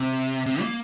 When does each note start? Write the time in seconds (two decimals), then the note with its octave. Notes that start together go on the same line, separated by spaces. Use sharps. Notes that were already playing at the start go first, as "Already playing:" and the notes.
Already playing: C3
0.46 C3
0.61 A#3